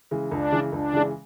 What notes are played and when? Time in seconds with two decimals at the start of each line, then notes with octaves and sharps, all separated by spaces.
0.11 C#3 E3 G#3
0.31 C#2 D4
0.52 C#3 E3 G#3
0.72 C#2 D4
0.93 C#3 E3 G#3